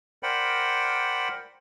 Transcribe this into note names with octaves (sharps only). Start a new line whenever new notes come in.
A#4 C5 D5 F#5 G5 B5